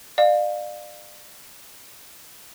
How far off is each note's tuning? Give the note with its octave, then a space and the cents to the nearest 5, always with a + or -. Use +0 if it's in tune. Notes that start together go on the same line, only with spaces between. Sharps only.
D5 +35 F5 +15